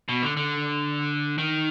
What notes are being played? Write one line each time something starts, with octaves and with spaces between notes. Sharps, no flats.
B2
D3
D3
D#3